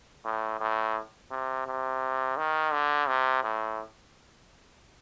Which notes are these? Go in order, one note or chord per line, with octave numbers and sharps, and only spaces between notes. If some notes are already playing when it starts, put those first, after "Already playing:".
A2
A2
C3
C3
D#3
D3
C3
A2